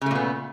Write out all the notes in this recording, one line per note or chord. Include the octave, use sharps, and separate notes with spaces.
A#2 C#3 A3 B3